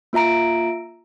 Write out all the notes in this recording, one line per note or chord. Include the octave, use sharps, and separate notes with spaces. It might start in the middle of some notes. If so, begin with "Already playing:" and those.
A#3 F4 E5 A#5 D7